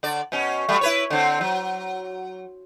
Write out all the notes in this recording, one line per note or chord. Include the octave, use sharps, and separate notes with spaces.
D3 D5
B2 C#4
F#3 G3 A3
E4 B4 C#5
D3 C4
F#3